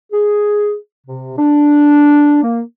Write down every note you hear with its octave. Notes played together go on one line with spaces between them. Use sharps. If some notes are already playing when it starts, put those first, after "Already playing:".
G#4
C3
D4
A#3